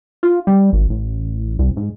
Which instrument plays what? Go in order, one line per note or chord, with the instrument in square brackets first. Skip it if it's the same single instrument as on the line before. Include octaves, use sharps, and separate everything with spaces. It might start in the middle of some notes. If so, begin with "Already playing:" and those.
[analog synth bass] F4
G3
G#1
A1
C2
G#2